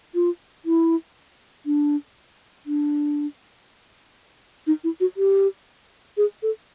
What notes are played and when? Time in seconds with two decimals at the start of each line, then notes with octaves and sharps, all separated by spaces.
0.15 F4
0.65 E4
1.66 D4
2.66 D4
4.67 D#4
4.84 E4
5.00 F#4
5.17 G4
6.17 G#4
6.43 A4